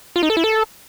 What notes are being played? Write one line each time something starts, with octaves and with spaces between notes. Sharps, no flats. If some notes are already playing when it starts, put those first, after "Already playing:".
F4
D#4
A4
E4
A4